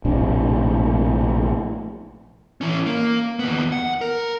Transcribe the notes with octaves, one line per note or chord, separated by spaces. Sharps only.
A#1 A2 C3 D4
E3 C#4
A#3
D#2 B3
F#5
A#4